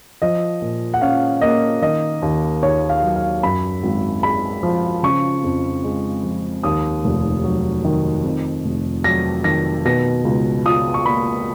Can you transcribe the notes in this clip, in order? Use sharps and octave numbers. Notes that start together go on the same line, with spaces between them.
F3 D#5
A#2
F#5
C#4 F5
A#3 D#5
D#3 D#5
D#2
D#2 C#5
F5
F#3
F5
F#2 B5
G#1
G#3 B5
F3
C#3 C#6
F2
G#3
F3
D#2 D#6
F1
F#3
D#3
F2
F1
F#3 A#6
D#3 A#6
B2 A#6
C#2
F4 D#6
C#6
A#3 B5